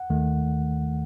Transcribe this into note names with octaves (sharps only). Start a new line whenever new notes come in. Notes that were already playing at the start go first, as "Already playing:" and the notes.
Already playing: F#5
D#2 D#3 A3